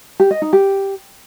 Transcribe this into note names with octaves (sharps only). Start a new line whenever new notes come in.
G4
D#5
D#4
G4